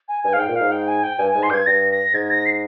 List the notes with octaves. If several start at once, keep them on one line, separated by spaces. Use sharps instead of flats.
G#5
G2 G#5
F5
G#2
G5
A#2
G#2 F5
G5
G#5
G5
G2 G#5
G#2 G#5
C6
G2 G6 G#6
G2 A#6
A#6
G#2 G#6
A#6
C7